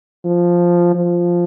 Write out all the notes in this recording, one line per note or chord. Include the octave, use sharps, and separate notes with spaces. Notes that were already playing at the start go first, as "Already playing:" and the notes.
F3
F3